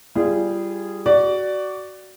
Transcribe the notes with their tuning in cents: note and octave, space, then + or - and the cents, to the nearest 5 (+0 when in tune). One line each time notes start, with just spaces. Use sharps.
G3 +0 F4 -40 G#4 -10
F#4 +20 D5 +0